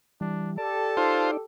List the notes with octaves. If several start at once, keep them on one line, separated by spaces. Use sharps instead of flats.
E3 G3 D4
G4 A4 D5 A5
D#4 F4 C5 D5